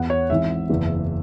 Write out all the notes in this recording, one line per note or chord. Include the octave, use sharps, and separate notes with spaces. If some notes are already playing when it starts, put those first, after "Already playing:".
Already playing: E2 E3 B3 E4 F#5
C#5
G#1 G#2 E3 E5
F#1 E2 E3